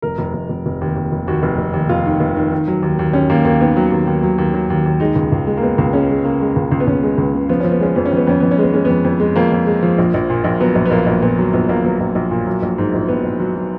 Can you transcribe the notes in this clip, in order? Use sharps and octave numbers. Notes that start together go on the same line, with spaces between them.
F1 A#4
F1
F1
F1
F1
D#2
D#2
F1
D#2 F#4
F1
F1
D#2
F1 F4
D#3
F1
D#3
D#3
F#3
D#2
D#2
D#2 C#4
D#2 A#3
D#2 A#3
D#3 B3
F#3
D#2
D#2
F#3
D#2
F#3
D#2
D#2
G#3 D#4
C#2
C#2
G#3
A#3
G#3 B3
C#2
G#3 C#4
G#3
C#3 A#3
G#3
C#2
C#2
B3
C#2 C#4
G#3
C#2
C#3
F3 B3
F3 C#4
B3
G#3 C#4
F2 B3
C#4
F2
B3
F2 C#4
F2 B3
C#4
G#3 B3
G#3 C#4
F2 B3
F2
G#3
F2 A#3
F2
G#3
F3
A#1
A#1
A#2
A#1
F#3 B3
A#1
B3
A#1 A#3
A#1
A#2 B3
F#3
A#1 B3
A#1 A#3
F#3 B3
A#1
A#1
A#2
F#3
A#1
G#2
A#1
A#1 B3
A#1
F#3
F#3